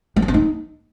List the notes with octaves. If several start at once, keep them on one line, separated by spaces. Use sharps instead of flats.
F#3
F3
C4
D#4